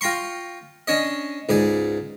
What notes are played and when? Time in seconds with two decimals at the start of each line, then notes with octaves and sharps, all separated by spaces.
0.01 F4 G5 A#5 C6 C#6
0.88 C#4 D4 C#5 D#5
1.49 C#2 G#2 D5 G#5